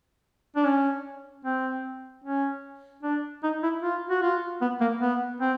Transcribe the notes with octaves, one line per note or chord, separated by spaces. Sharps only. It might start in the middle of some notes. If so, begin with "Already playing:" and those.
D4
C#4
C4
C#4
D4
D#4
E4
F4
F#4
F4
B3
A#3
B3
C4